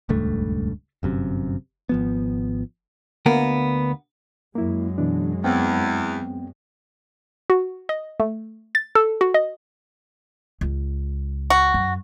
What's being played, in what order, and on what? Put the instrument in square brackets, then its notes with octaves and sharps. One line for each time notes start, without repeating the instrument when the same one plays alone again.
[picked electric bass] D#1 C#2 G2 A3
G1 F#2 C3
G#1 F3 B3
[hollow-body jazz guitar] D2 A#3 B3 A#4
[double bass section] F#2 G#3 [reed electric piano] A#3 E4
[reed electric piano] B2 E3 D4
[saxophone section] E2 [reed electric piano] B3 C4 G5
[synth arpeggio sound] F#4
D#5
A3
A6
A4
F#4
D#5
[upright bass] C#2
[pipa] F#4
[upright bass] F#2